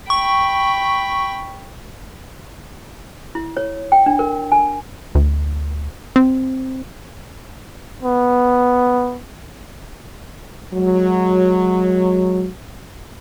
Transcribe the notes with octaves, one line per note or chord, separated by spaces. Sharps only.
G5 B5 C#6
E4
C#5
G5
D4
A#4
G#5
D2
C4
B3
F#3 G#3